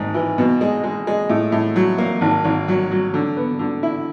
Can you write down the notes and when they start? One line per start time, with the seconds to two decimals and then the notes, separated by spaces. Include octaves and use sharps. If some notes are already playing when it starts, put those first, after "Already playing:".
Already playing: G#1 G#2
0.14 E3
0.38 B2
0.61 G#3
0.84 G#3
1.07 G#3
1.29 A2
1.52 A2
1.76 F#3
1.98 A#3
2.21 G#1
2.44 G#1
2.68 F#3
2.91 F#3
3.14 D3
3.37 B3
3.59 D3
3.83 E4